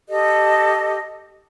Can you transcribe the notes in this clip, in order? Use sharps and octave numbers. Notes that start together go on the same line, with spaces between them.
G4 A4 D#5